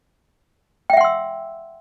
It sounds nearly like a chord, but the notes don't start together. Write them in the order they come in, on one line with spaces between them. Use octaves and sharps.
G5 E5 F#5 C6 E6